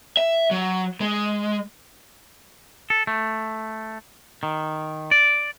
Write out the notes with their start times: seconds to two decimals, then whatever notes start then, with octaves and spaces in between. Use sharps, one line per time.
0.17 E5
0.51 F#3
1.01 G#3
2.90 A4
3.07 A3
4.43 D#3
5.11 D5